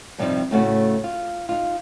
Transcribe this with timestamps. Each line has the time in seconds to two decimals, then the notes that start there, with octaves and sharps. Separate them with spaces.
0.18 G2 C3 F3 G3 C4 D#4
0.51 A2 C#3 A3 B3 C#4 F#4
1.04 F4
1.49 D#4 F4